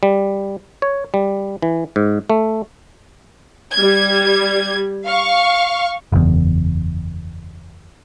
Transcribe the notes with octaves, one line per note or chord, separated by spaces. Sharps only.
G3
C#5
G3
E3
G#2
A3
G3 G#6
F5 C#6
F#1 E2